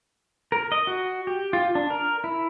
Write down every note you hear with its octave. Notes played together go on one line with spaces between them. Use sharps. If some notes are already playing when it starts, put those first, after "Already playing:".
A#4
D#5
F#4
G4
F4
D4
A#4
E4